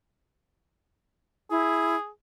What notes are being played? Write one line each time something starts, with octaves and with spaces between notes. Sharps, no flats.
E4 G#4